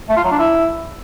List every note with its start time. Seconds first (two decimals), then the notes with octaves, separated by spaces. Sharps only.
0.09 A3
0.17 F4
0.24 F#3
0.31 D4
0.39 E4